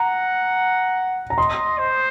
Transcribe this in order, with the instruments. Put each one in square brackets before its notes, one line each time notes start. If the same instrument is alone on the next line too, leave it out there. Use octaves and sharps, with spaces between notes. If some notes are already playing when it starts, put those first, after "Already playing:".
Already playing: [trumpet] F#5 [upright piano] A#5
[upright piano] A#5
[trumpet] D#5 [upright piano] C6
[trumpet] C5